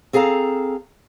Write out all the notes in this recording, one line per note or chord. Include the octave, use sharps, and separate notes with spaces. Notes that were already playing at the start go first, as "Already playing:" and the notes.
C4 G#4 A4 F5 A#5